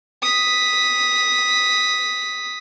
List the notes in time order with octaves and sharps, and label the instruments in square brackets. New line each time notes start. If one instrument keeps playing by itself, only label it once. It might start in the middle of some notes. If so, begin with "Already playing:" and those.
[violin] D#6 B6